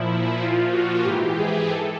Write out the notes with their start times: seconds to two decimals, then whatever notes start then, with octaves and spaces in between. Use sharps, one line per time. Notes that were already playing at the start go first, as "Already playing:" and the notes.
Already playing: A#2 F3 E4
0.40 A#2 F3 F4
0.72 F#4
1.04 G#2 E3 G4
1.37 G#4
1.69 A4